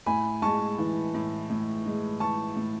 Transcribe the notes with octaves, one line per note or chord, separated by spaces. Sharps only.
A2 G#5 B5
G#3 A5 C#6
E3
A2
A2
G#3
E3 A5 C#6
A2